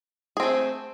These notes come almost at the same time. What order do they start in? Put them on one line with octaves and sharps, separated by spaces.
G#4 C4 A3